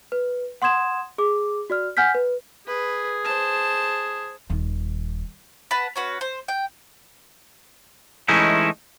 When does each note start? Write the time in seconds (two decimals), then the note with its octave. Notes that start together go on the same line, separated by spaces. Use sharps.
0.12 B4
0.62 F#5 C6 D#6 G#6 E7
1.18 G#4 D6
1.70 F#4 D5 F6
1.97 F#5 G#5 F6 G6 B6
2.15 B4
2.67 G#4 B4
3.24 C5 A5
4.50 D#1 D#3
5.71 B4 F#5 A5
5.96 C#4 F#4 B4
6.21 C5
6.48 G5
8.28 E3 G#3 A3 C#4 D#4 E4